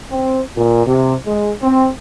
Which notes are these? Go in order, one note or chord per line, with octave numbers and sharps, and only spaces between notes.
C4
A#2
C3
G#3
C4